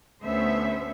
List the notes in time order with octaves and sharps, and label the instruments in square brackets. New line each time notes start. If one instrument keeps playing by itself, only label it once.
[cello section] D2 A3 B3 C#4 C5 E5